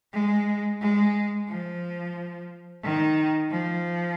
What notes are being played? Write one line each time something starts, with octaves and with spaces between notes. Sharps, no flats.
G#3
G#3
F3
D#3
F3